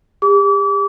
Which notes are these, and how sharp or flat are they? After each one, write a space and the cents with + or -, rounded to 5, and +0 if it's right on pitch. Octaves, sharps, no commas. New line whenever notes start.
G4 +45 D6 -35